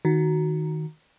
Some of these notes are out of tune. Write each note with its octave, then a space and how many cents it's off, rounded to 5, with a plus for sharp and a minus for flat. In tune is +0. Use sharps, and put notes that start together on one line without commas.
D#3 +0 F#4 +0